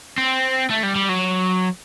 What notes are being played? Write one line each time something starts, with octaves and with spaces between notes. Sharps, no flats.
C4
A3
G3
G3
F#3